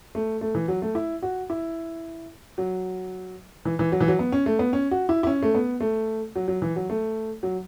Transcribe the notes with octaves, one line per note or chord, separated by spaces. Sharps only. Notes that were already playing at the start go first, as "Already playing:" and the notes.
A3
A3
E3
F#3
A3
E4
F#4
E4
F#3
E3
E3
F#3
E3
F#3
B3
C#4
A3
B3
C#4
F#4
E4
E4
C#4
A3
B3
A3
F#3
F#3
E3
F#3
A3
F#3